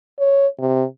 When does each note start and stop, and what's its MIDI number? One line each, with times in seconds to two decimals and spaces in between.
0.19 0.47 73
0.59 0.84 48